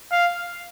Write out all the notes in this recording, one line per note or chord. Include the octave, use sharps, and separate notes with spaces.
F5